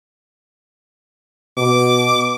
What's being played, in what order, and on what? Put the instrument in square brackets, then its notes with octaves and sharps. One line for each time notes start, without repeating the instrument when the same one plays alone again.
[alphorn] B2 [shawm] D6